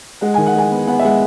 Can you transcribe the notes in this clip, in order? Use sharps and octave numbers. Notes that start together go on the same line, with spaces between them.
G#3 F#5
D#3 G#5
F#5
G#3 G#5
B3
B3 F#5
E5
G#3 F#5